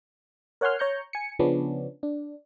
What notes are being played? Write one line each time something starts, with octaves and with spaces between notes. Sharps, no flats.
A#4 C#5 F#5 G#5 C6 F6
C#5 A#5 G6 C#7
G#5 C#7
C#3 F3 B3 C#4 D4
D4